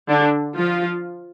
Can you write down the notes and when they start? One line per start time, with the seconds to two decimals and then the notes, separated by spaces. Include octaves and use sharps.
0.08 D3 D4
0.55 F3 F4